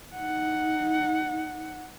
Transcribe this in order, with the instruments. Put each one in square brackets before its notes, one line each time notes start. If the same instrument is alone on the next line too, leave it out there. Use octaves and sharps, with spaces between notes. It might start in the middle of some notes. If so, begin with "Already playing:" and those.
[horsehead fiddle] D#4 F#5